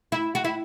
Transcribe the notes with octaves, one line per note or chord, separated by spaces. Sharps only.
E4
F#4
E4